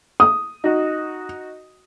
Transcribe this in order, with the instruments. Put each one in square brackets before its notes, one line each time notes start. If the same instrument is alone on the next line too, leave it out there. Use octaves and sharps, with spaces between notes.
[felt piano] D#6
[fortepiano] D#4 F#4